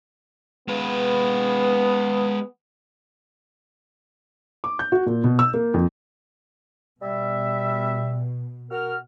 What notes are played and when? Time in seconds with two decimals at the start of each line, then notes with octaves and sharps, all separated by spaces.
0.68 G#3 B3 B4
4.64 D6
4.79 G6
4.92 F#4
5.06 A#2
5.24 B2
5.39 E6
5.54 A#3
5.74 F2
7.02 B2 G3 E5
8.70 F#4 A#4 F6